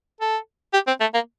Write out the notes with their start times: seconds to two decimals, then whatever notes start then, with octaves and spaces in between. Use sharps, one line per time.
0.21 A4
0.73 G4
0.87 C4
1.01 A3
1.14 A#3